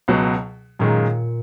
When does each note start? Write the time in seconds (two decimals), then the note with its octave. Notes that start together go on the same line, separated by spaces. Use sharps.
0.08 C#2 B2 F#3
0.79 F#2 A#2 D#3 G#3